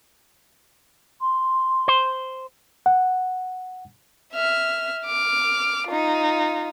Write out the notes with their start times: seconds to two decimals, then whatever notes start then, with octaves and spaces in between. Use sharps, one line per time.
1.20 C6
1.88 C5
2.86 F#5
4.34 E5 F6
5.06 D6 F6
5.87 D#4 F4